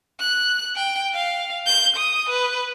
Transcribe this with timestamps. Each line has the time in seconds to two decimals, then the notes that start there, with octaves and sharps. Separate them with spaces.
0.20 F#6
0.76 G5
1.14 F5
1.66 G6
1.97 D#6
2.29 B4